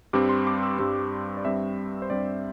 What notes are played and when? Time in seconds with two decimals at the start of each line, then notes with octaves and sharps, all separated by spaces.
0.13 G2 G3 C4 D6
0.29 C6
0.47 D6
0.63 E6
0.79 G2 G3 C4
1.37 D5
1.45 G2 G3 C4 E5
2.02 C5
2.10 G2 G3 C4 D5